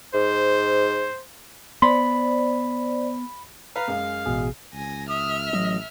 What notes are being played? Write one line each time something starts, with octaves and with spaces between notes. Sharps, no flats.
G#2 C5
B3 C5 D5 B5 C6
B4 F5 A#5
F#2 G#3
A1 B2 G#4
C#2 G#5 A#6
E5 D#6 F6
A1 F#3 D#5